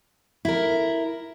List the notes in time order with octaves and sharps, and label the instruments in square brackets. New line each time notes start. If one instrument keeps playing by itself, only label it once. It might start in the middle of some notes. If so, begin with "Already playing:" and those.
[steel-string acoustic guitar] E4 A#4